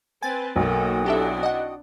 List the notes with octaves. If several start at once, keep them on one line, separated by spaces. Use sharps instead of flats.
C4 B4 C5 G5 G#5 A6
B1 A#3 F#4 A4 G5 D#6
C4 D4 E4 G4 A4 E5
D#5 F#5